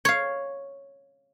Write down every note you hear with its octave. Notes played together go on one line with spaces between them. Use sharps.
C#5 F5